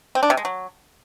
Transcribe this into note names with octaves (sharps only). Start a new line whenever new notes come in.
C4
D4
C3
G#3
F#3